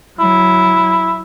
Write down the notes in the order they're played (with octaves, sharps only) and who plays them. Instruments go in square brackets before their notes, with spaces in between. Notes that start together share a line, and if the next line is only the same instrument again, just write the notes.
[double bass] F#3 [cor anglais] E4